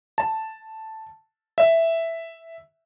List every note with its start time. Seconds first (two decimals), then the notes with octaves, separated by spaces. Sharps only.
0.18 A5
1.58 E5